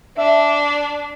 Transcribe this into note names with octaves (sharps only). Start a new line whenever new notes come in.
D4 E5